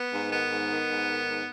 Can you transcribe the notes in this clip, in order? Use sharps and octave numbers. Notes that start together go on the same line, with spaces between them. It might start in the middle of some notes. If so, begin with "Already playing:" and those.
Already playing: B3
G#2
D#3 B3
G#2
D#3
G#2
D#3
G#2